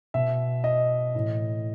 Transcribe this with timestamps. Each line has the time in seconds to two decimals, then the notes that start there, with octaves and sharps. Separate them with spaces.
0.14 B2 E5
0.64 D#5
1.15 A2 E3